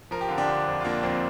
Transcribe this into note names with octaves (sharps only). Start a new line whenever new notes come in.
F3 A#4
G4
D3 F4
D4 G4
D3
F2
F4
F3 A#3 D4
F2 C4